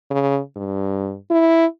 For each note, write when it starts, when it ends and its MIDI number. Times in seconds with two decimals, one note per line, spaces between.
0.11 0.39 49
0.56 1.15 43
1.31 1.66 64